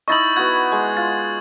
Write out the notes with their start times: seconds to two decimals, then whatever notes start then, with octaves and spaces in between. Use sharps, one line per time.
0.08 D#4 E4 D#5 C#6 A6 F#7
0.36 B3 F#4 G#6
0.72 G#3
0.97 F4 A6